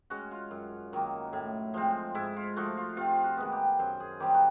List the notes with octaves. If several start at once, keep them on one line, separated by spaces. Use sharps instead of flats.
G#3 C#4 F#4
F4
F#2
D#3 F#3 A#3
A2
F3 G#3 C4
G#2 E4
F4
F3 A3 F#4
F4
C3 F4
F#4
D#3 G#3 B3
G4
F#2 C5
G#4
D#3 G3 C4 G4
F#4